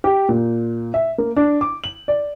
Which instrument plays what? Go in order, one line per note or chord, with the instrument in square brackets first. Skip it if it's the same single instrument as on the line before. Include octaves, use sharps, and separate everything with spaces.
[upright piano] G4
A#2
E5
A#3
D4
D6
F#7
D5